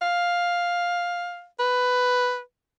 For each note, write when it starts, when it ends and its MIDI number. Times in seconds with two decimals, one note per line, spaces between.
0.02 1.46 77
1.59 2.40 71